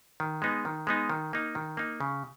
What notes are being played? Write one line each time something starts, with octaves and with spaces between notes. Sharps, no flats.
D#3
G#3 B3 D#4
D#3
G#3 B3 D#4
D#3
A#3 D#4
D#3
A#3 D#4
C#3